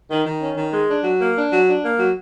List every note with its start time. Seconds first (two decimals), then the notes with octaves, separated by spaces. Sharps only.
0.09 D#3
0.25 D#3
0.40 C#4
0.56 D#3
0.72 G#3
0.88 D4
1.03 F#3
1.20 A#3
1.35 D4
1.51 F#3
1.67 D4
1.83 A#3
1.99 F#3